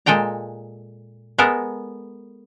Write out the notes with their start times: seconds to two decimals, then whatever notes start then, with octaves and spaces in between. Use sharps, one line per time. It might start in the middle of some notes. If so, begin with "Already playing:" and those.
0.06 A#2 G#3 A4 G5 A#5
1.38 G#3 B3 A4 A#4